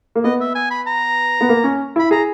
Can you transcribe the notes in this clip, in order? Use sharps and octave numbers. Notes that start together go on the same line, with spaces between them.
A#3
B3 D#5
E5
G#5
B5
A#5
B3
A#3
C#4
E4 B5
G#4 A#5